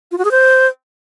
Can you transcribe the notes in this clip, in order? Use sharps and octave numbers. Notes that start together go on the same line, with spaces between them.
F4
F#4
G#4
C5